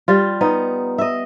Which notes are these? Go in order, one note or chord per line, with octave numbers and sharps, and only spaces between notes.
G3 F4
B3 D#4
D#5 E5